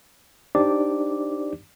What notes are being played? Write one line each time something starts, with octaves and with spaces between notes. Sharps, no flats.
D4 D#4 G4 C5 D5 D6